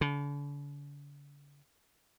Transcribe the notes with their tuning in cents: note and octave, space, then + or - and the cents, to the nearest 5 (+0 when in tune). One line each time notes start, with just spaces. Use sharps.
D3 -45